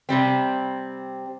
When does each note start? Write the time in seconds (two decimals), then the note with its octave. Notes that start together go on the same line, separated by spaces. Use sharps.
0.09 C3 G3 C4